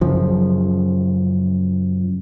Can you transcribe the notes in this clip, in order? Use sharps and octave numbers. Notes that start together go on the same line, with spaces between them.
F#2 C#3 F3